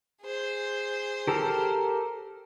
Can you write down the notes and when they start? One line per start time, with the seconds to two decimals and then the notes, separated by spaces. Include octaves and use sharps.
0.22 G#4 C5
1.27 G4 A4 A#4